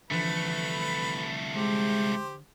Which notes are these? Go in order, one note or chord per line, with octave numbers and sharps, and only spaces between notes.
C2 D3 E3 F3 A3 B4 B5
G#3 G4 C5